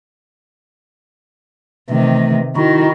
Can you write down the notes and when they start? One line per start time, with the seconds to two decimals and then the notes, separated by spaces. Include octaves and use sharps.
1.90 C3 D#3 E3 A3
2.56 D#3 D#4 E4 F#4